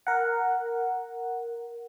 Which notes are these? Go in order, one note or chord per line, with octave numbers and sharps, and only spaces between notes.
A#4 F#5